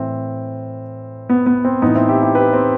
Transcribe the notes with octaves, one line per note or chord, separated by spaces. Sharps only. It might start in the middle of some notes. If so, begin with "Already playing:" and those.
Already playing: A2 E3 C4
B3
B3
C4
A2 E3 B3 D#4
C4 E4
E4 G4
E4 G4
G4 B4
C4